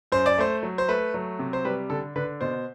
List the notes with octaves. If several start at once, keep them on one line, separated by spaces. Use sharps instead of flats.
F#2 C5
D5
A3 C5
F#3
C5
A3 B4
F#3
C3
C5
G3 B4
D3 A4
D3 B4
B2 C5